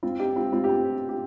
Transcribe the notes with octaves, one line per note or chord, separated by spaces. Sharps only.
C4 F4
D#4 G4
C4 F4
C4 F4
G4
C4 F4
G4